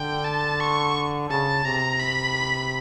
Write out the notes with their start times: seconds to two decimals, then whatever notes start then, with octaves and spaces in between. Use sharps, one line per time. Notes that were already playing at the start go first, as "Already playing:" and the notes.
Already playing: D3 G5
0.25 A5
0.61 C#6
1.30 C#3 A5
1.64 C3 A#5
2.00 B5